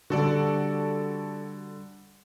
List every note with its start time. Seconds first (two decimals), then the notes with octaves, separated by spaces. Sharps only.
0.10 D3 G3 F#4 A4 D5